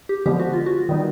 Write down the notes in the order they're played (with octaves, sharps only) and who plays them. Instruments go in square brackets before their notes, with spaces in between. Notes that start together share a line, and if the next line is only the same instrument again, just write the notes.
[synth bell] G4
[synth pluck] D3 F3 G#3 B3 [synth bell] G4
[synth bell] F#4
F4
F#4
[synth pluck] D#3 G3 B3 D#4